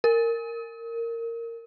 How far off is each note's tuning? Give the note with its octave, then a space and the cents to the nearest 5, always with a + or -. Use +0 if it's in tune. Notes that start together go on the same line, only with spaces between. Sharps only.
A#4 -15